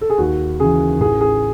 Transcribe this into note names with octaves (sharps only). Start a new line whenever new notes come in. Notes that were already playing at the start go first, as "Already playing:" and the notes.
A4
G#4
D#2 F#4
C#3 E3 G#4
A1 G#4
G#4